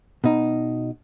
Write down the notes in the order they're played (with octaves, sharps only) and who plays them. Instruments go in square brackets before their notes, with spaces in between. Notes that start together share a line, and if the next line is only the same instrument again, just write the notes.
[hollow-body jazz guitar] B2 D#4